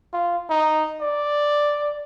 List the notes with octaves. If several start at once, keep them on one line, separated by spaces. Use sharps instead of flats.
F4
D#4
D5